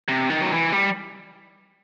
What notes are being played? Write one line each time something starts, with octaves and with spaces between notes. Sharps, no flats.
C3
D#3
F#3
E3
G3